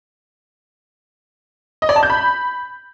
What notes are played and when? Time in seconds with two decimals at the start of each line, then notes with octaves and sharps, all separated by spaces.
1.82 D#5
1.89 D5
1.96 A5
2.03 G6
2.10 B5